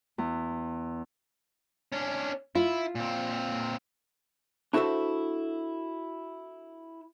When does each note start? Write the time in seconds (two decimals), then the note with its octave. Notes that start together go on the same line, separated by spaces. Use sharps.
0.18 E2
1.92 C#4 D4
2.55 E4 F4
2.95 A#2 C4
4.73 D4 E4 F#4 A4 C5 E5